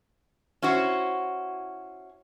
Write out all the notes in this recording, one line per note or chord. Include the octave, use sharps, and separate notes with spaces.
C#4 E4 F#4 C5